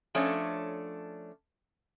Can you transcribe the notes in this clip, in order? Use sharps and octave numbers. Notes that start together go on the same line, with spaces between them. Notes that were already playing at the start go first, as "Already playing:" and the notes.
F3 A3 C#4 D4 C#5